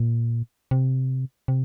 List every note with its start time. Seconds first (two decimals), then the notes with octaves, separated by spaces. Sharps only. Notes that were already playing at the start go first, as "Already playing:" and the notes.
Already playing: A#2
0.71 C3
1.48 C3